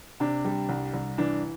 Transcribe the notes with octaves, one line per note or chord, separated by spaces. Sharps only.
C3 D4
G3
C2
C2
E3 D4